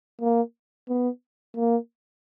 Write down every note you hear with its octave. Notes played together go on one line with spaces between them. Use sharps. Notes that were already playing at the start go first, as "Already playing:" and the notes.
A#3
B3
A#3